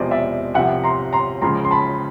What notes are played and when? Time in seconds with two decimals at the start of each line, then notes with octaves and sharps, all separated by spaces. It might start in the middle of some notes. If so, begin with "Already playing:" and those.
Already playing: E1 E2 C3 F3 C5 D5 D#5
0.11 D5 E5
0.54 C2 C3 F3 E5 F#5
0.84 A#5 C6
1.13 A#5 C6
1.42 C#2 C#3 F3 A#5 C6
1.65 C6
1.71 A5 B5